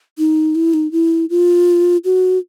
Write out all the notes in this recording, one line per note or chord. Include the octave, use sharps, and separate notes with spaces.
D#4
E4
D#4
E4
F4
F#4